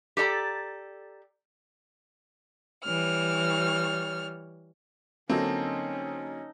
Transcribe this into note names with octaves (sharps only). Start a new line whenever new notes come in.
G4 A4 D5 A#5
E3 G3 C#5 F6
D3 F#3 A#3 C4 C#4 D#4 A4 D#5